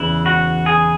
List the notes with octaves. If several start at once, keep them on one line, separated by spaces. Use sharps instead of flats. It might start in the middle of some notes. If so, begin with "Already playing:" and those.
Already playing: E2 C#3 E3 E4
F#4
G#4